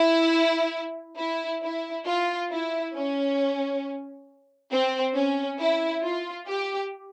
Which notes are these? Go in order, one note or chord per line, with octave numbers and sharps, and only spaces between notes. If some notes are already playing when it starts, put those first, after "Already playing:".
Already playing: E4
E4
E4
F4
E4
C#4
C4
C#4
E4
F4
G4